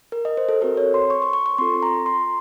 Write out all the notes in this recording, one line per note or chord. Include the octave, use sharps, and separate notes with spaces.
A#4
D#5
C5
A4
C4 F#4 A4 A#4
C#5
C6
C#6
C#6
C#6
C#6
C4 F4 A4 C6
A#5
C6